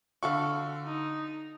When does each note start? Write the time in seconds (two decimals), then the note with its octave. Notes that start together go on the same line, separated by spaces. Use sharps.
0.23 D3 F#4 A4 F5 C#6
0.85 D#4